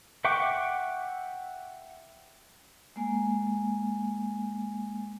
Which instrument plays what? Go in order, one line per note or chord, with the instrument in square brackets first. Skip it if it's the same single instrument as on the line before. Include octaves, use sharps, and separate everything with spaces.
[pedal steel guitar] E5 F#5 G5 C#6 D6
[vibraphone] G#3 A#3 G#5